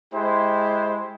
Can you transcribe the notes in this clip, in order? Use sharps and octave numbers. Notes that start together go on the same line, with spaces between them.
G#3 E4 G4 C5